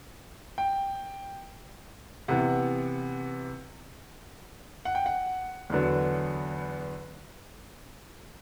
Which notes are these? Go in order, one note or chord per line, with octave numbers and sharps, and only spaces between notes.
G5
C3 E3 B3 F#5
F#5
G5
F#5
E2 D3 F#3 B3